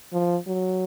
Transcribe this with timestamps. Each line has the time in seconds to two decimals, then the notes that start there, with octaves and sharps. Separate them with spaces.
0.13 F3
0.47 F#3